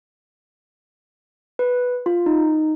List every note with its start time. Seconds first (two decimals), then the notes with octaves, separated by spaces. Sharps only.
1.59 B4
2.06 F4
2.26 D#4